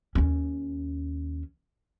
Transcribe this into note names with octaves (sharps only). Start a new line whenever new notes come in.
D#2 C#4